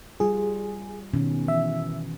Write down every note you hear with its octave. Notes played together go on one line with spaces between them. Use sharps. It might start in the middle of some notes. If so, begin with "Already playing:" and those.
G3 F4 G#4
B2 D#3 C#4
E3 E5